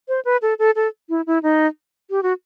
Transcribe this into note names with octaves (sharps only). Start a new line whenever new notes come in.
C5
B4
A4
A4
A4
E4
E4
D#4
G4
F#4